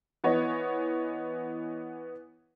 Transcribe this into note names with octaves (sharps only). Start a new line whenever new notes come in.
E3 B3 C#5 D#5